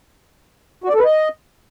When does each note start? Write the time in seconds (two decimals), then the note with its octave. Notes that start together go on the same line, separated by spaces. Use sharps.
0.84 F#4
0.89 D5
0.94 A4
0.99 B4
1.04 D#5